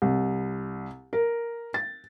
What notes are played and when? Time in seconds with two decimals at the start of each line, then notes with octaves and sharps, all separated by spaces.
0.02 C2
1.13 A#4
1.74 A6